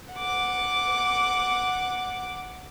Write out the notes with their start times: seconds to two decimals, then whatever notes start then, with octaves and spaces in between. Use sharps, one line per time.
0.13 F#5 D6